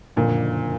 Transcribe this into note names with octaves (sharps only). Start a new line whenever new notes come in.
F#1 F2 A#2 D3